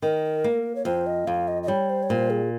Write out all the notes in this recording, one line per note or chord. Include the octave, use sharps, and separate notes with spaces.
D#3 A#4
A#3
C#5
F2 C5
D#5
F2 F5
D#5
D#5
G3 C#5
C5
C#5
A#2 C5
G#4